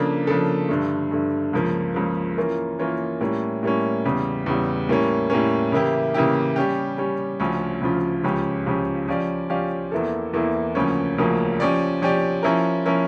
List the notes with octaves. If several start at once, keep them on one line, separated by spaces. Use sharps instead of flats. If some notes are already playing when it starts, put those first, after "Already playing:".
Already playing: C#3 F3 A#3 D4 A4
C#3 F3 A#3 D4 A4
G2 D3 A3
G2 D3 A3
C#2 C#3 F3 A#3
C#2 C#3 F3 A#3
E3 A#3 C#4 F4 A#4
E3 A#3 C#4 F4 A#4
A2 G3 A#3 C#4
A2 G3 A#3 C#4
E2 C#3 G3
E2 C#3 G3
A2 G3 A#3 C#4
A2 G3 A#3 C#4
C#3 E3 A#3 E4 G4
C#3 E3 A#3 E4 G4
G3 C#4 G4
G3 C#4 G4
D2 C#3 F3 C#4 F4
D2 C#3 F3 C#4 F4
C#2 C#3 F3 C#4 G4
C#2 C#3 F3 C#4 G4
F3 C#4 G4 D5 F5
F3 C#4 G4 D5 F5
E2 E3 A#3 E4 A4
E2 E3 A#3 E4 A4
D2 C#3 F3 A#3 C#4
D2 C#3 F3 A#3 C#4
F3 C#4 G4 D5
F3 C#4 G4 D5
F3 C#4 E4 A#4
F3 C#4 E4 A#4